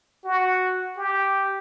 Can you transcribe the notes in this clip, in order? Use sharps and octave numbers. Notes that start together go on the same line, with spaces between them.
F#4
G4